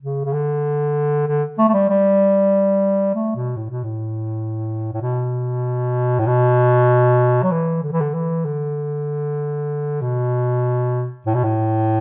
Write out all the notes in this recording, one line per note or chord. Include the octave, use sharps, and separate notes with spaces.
C#3
C#3
D3
D3
A3
A3
G3
G3
A3
B2
A2
B2
A2
A2
B2
A2
B2
F#3
E3
D3
E3
D3
E3
D3
B2
A2
B2
A2